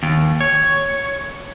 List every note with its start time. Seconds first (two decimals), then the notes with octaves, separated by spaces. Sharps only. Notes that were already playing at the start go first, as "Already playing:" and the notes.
0.03 D#2
0.41 C#5